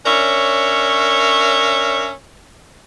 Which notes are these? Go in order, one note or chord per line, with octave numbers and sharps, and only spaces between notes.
C#4 D4 A#4 C#5 E5